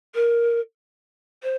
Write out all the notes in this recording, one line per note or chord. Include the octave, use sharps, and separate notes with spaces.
A#4
C5